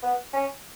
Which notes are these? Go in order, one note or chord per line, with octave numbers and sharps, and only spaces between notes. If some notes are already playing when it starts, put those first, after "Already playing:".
B3
C#4